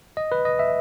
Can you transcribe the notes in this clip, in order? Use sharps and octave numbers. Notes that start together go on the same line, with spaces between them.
D#5
B4
D#5
E5